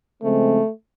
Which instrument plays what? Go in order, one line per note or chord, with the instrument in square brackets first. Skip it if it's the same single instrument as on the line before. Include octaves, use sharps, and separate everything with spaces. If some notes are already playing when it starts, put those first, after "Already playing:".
[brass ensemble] C#3 F3 G#3 C4 [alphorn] A3